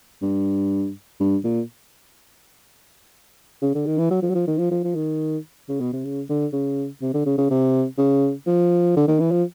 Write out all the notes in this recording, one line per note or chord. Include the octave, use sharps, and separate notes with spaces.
G2
G2
A#2
C#3
D3
D#3
E3
F#3
F3
F#3
F3
D#3
F3
F3
F3
D#3
C#3
B2
C3
C#3
D3
C#3
C3
D3
C#3
C#3
C3
C#3
F3
D3
D#3
E3
F3